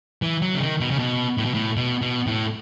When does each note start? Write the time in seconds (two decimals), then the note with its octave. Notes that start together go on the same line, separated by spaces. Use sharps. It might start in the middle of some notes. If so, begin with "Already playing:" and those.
0.22 E3
0.42 F#3
0.54 C#3
0.60 D#3
0.81 B2
0.91 C#3
0.99 B2
1.38 A2
1.45 B2
1.54 A2
1.77 B2
2.02 B2
2.27 A2